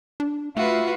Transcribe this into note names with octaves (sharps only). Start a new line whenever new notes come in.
D4
A3 F4 F#4 B4 E5